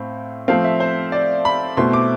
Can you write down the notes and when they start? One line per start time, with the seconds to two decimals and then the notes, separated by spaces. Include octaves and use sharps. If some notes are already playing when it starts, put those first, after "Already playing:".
Already playing: A2 C4 F5
0.48 F3 A3 C4 F5
0.64 E5
0.80 C5
1.12 D5
1.45 B5
1.77 B2 A3 C4 E4 C6
1.93 D6